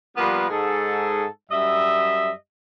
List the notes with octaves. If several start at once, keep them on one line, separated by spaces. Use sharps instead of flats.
F3 G3 A#3 B3 A#4 B4
G#2 G#4 A4
F#2 G3 D#5 E5